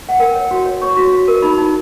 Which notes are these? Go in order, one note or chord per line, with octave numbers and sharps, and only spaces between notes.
F#5
A#4 G5
C#5
F#4
C#5
C#5 C#6
F#4
F#4
A#4
D#4 B5
D#4